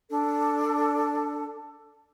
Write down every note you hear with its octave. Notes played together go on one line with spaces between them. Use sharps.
D4 A4